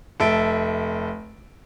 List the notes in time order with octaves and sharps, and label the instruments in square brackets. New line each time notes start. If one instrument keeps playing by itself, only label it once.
[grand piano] F1 A4 E5 D7